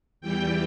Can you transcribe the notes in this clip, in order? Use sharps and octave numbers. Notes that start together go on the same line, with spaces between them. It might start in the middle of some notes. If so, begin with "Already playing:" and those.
E2 E3 G3 G5